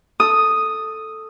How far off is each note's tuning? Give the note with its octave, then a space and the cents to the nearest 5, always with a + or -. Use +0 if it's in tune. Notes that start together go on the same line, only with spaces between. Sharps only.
A4 +0 D#6 +0